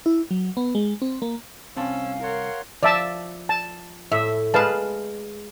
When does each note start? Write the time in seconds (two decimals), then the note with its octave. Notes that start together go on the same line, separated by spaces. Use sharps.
0.06 E4
0.31 F#3
0.57 B3
0.75 G#3
1.02 C4
1.22 A#3
1.76 C2 C4 C#4 F5 A5 E6
2.23 A#4 C#5 F#5 C6
2.83 F3 D5 E5 A5
3.49 A5
4.12 A2 E5
4.54 G#3 G#4 B4 F5 A5